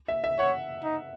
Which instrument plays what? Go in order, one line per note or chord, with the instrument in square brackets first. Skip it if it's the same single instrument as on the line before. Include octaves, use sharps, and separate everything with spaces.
[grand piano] E5
E5
[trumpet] C#5 [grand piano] F#5
[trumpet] D#4